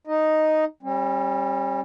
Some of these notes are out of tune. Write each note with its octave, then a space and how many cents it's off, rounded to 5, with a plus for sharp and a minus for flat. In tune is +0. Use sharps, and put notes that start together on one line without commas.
D#4 +0 D#5 +0
G3 +0 C#4 -40